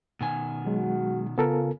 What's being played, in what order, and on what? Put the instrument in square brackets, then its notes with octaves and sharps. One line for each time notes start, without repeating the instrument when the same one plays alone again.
[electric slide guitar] B2 D#3 G#5
[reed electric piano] F#3 G#3 [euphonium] F#4
[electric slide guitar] C#3 [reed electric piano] B3 A4 A#4 [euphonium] F4